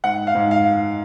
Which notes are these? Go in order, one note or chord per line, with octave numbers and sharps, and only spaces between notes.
G#2 F#5
F5
G#2
F5